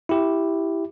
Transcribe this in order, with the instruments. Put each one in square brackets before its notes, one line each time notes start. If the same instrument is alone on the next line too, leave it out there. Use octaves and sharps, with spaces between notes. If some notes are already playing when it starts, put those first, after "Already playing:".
[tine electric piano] E4 G4